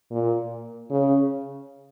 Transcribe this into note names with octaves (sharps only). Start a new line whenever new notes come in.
A#2
C#3